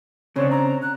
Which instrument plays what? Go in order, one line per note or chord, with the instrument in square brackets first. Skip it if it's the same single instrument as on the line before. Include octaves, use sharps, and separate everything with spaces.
[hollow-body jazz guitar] C#3 C4 D4 [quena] C#5
[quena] A#5
F#6